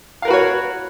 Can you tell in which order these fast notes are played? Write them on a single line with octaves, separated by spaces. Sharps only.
F5 A#4 B4 F#4 C#5